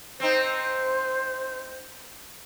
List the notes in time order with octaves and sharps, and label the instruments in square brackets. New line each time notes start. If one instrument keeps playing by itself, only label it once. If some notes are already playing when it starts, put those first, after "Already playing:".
[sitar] C4 D#4 [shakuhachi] C5